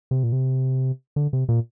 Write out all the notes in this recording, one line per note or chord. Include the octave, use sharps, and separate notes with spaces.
C3
A#2
C3
D3
C3
A#2